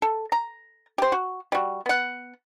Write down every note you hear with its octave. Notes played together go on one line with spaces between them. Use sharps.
A4
A#5
G4 C5
F#4
G3 F#4
B3 F#5